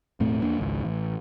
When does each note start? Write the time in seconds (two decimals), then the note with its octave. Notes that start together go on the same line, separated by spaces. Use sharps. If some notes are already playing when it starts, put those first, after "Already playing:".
0.20 E1 A2 A3 C4
0.42 E2 A#3 D4
0.58 G#1 C#2
0.85 A1